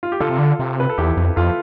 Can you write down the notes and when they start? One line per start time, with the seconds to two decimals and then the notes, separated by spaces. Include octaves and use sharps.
0.03 F4
0.12 G4
0.20 D3 F4 A4
0.29 C3
0.38 D3
0.59 C3
0.80 B4
0.89 A4
0.98 E2 E4 G4
1.17 F2
1.36 F2 F4 A4